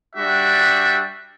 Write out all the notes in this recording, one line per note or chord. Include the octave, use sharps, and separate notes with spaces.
G3 D4 F#4 E5